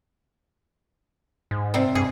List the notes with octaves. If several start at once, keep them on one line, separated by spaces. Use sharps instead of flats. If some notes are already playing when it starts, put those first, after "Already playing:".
G#2
C3 G3 C4
G2 G#4